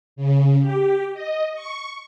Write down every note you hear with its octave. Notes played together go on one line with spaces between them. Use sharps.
C#3
G4
D#5
C#6